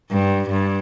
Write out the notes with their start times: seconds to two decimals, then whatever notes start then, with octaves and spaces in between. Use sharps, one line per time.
0.11 G2
0.50 G2